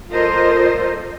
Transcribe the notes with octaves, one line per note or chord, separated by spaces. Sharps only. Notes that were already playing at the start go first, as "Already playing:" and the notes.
F4 A4 A#4 C5 D#5